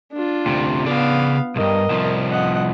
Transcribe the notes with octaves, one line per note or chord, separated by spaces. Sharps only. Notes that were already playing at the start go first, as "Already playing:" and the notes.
D4 F4
D2 C3
C#3 B3 D5 F5
B1 G2 A#4 D#5
C2 F3
D#5 F#5